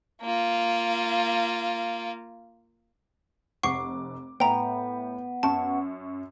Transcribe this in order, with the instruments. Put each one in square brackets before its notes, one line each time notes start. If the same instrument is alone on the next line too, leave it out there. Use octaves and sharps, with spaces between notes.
[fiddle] A#3 F4
[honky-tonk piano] F1 D6 [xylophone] F#5 C#6 C7
[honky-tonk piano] A2 [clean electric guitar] B3 [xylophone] G5 A#5
[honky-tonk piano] F#2 C#6 [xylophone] A5